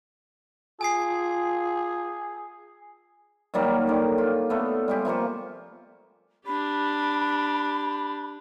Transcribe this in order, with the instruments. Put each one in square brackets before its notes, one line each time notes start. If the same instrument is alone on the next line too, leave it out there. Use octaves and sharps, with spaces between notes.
[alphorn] F4 [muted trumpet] G#4 [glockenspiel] G#5 D#6 C7
[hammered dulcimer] D#3 F#3 G3 A#3
D3 D#3
F4
A3 B3
G3 G#3 G4
C3 F3 A#3 C#6
[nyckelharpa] D4 G4 [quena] B5